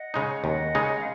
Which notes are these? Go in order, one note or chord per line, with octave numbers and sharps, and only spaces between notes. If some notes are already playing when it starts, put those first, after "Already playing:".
Already playing: D#5 F#5
C#3 G#3 D#4
D#2 D#5 F#5
C#3 G#3 D#4
F5